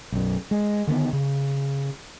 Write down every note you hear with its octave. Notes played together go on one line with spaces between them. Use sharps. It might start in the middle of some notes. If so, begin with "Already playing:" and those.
B1 F#2
G#3
D3 D#3 A#3 B3
C#3